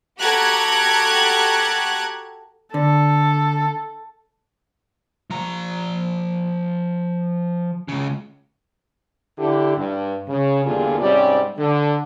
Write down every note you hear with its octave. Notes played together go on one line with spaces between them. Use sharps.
F#4 G4 A4 A#5 F#6 G#6
D3 A4
F3 A#5
C#2 C#3
D3 E4 G4
G2
C#3
E2 A#2 D3 G3 F4 G#4
G#2 C3 G3 C#4 G4 D5
D3